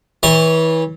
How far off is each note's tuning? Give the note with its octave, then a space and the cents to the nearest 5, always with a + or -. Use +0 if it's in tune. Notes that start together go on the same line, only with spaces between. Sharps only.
E3 -30 C#5 +0 C6 +35